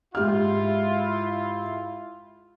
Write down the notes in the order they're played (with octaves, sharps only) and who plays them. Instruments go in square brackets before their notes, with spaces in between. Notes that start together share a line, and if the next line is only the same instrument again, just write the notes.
[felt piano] G#2 G4 F6 [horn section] E4 F4